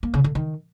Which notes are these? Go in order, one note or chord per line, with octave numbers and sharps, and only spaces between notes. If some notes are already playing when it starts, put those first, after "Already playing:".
A#3
C#3
D3
D#3